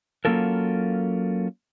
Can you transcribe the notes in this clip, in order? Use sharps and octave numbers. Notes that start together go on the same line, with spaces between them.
F#3 A#3 C#4 F4 A4 A#4